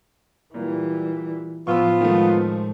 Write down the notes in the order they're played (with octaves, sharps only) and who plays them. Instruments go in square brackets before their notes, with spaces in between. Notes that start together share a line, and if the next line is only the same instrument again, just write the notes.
[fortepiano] A#2 [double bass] E3 G3
[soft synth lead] A2 [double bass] F3 [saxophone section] B3 F4 [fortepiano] C#6 E6
[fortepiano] D#3 A3 [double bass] F3 G#3